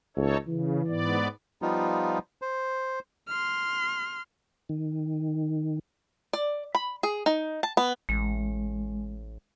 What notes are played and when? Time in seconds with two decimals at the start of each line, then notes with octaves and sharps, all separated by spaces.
0.17 C#2 D#4 A4 C#5
0.47 C#3 E3
0.87 G#2 B3 D5
1.62 F3 G3 B3 D#4 F4
2.42 C5
3.28 C6 F6
4.69 D#3
6.33 D5
6.75 B5
7.03 G#4
7.26 D#4
7.63 A5
7.77 B3
8.09 A1 G#3